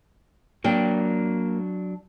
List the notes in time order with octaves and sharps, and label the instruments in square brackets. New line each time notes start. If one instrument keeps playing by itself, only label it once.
[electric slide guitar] F#3 D4 [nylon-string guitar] A#3 G5